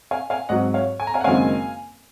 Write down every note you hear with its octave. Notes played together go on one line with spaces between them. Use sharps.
F5 G#5
F5 G#5
G#2 F#3 C4 D#5 F#5
C#5 F5
G#5
A#5
F5 G#5
F#5
F#1 F#2 D#3 G#3 C4 F5 G#5